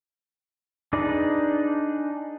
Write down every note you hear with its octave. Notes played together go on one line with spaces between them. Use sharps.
D4 D#4 G#4 B4 D5